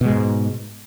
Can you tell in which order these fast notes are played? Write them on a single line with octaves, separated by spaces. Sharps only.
B2 G#3 G#2